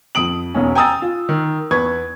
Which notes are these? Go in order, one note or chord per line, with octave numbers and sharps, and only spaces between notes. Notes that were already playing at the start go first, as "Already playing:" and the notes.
F2 D#6 D7 F#7
E1 B1 C#4
G5 G#5 A#5 D#6 E6 A6
F4
D#3
E2 B4 C#6 G#6